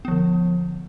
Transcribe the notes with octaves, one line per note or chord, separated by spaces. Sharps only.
D3 F3 B3